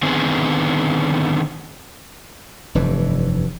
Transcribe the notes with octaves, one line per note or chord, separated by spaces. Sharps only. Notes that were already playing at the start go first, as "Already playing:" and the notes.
D3 D#3 B3 C4 G#4
F1 G2 E3